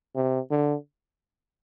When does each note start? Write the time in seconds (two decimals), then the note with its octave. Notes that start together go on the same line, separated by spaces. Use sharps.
0.15 C3
0.50 D3